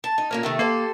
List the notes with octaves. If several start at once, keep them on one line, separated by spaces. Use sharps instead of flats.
A5
D#4
A#2 A#3 C#4
C3 D#3 A3
A#3 G4 A4 C5